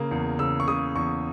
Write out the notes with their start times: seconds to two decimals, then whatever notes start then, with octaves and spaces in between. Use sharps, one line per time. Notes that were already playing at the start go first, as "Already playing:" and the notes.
Already playing: C#3 A#3
0.11 E2
0.39 C#3 E6
0.60 C#6
0.67 C#3 D#6
0.95 E2 C#6